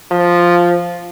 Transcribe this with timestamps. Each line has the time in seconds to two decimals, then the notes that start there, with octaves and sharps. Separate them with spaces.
0.12 F3